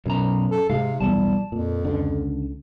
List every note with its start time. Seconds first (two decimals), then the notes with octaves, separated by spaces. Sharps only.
0.06 B1 F#2 A#5
0.51 A4
0.70 G#2 C3 G#3 F5
1.00 B1 E2 G3 A5
1.52 F2 A#2
1.85 C#2 D3